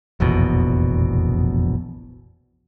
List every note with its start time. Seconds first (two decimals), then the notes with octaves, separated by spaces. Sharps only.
0.20 F1 A#1 E2 B2